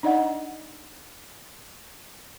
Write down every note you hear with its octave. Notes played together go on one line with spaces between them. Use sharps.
D4 D#4 D5 D#5 F#5